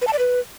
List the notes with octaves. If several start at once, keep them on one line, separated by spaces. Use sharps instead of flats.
B4
A5
D5
B4